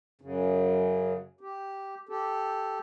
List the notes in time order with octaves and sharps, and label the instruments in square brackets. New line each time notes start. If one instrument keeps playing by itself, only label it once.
[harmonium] F#2 C#3
G4
G4 A4